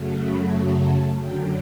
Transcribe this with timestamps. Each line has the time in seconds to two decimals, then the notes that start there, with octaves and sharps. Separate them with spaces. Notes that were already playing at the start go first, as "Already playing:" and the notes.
Already playing: F#2 C#3 F#3 A3
0.21 B5
0.87 A5
1.20 F#2 D3 F#3 G5